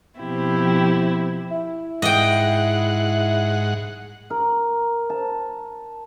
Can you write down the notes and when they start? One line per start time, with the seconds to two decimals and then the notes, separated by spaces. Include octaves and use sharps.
0.18 B2 F3 C4 E4 G4
1.51 E4
2.02 G#2 D#5 F#5 G5
4.30 A#4
5.10 A5